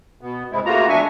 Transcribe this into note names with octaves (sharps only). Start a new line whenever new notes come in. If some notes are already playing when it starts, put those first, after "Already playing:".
B2 B3
G2 C3 G#3 C4 E4
C#3 A3 A#3 F4 F#4 A#5
E2 G#3 D4 E5 G#5 C#6